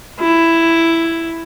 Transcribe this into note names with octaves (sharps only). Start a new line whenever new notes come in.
E4